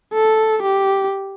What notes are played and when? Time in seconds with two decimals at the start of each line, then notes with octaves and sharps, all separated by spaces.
0.13 A4
0.62 G4